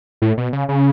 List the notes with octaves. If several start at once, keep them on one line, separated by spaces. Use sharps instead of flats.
A2
B2
C#3
C#3